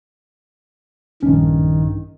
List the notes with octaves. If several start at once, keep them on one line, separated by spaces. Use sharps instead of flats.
A#1 G2 D#3 C#4